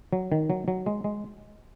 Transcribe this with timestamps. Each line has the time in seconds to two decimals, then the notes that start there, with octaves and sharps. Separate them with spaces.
0.13 F#3
0.32 D#3
0.50 F#3
0.68 F#3
0.86 G#3
1.04 G#3